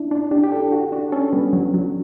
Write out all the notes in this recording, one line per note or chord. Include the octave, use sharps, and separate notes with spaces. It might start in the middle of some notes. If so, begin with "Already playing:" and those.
Already playing: D4 E4
D4
D4 G4
G4
D4 A4
F#4
D4 F#4
C#4 A4
G3 B3
F#3
F#3